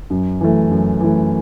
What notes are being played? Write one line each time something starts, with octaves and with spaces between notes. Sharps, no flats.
F#2
E3 A3
F#2
E3 A3